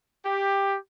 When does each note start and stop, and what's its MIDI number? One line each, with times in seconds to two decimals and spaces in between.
0.24 0.75 67